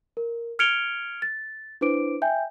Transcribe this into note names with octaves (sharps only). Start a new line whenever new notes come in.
A#4
F6 G#6 C#7 D7 F7 G7
A6
D4 E4 B4 C5 D6 D7
E5 G5 G#5 G6